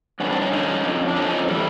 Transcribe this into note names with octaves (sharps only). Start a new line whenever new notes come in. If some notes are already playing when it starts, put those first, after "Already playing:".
G2 D3 B3 C#4
C4 D4
C#4 D#4
G2 D3 C#4 D#4
F2 D3
D4
F2 D3 C#4 D#4
E3 G3 A3